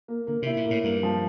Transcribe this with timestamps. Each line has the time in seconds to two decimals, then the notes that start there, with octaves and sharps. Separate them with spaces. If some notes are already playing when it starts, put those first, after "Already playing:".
0.08 A#3
0.27 D3 A#3
0.42 C3 E4
0.57 A#2
0.65 A#3
0.71 A2
0.84 G2 A#3
1.03 F3